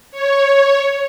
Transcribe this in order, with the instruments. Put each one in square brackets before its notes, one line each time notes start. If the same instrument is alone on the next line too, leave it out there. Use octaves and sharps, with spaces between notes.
[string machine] C#5